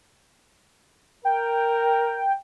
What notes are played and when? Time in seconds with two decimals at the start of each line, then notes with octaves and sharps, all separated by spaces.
1.25 A#4 G5